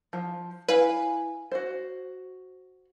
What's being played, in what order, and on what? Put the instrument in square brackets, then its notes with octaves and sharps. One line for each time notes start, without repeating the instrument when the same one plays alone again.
[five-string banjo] F3
[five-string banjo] E4 F5 G#5 [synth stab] B4
[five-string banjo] F#4 C5